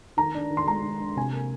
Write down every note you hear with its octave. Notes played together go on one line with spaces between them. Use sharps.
D#3 A#5
D4
D#3
C6
G#3 A#5
D#3
D4
C3 G#5
A#3